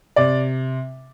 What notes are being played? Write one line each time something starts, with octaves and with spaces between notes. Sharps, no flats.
C3 D5